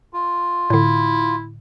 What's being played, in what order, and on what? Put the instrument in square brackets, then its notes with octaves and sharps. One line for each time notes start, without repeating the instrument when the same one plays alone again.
[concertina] F4
[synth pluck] A2 D3 [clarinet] E4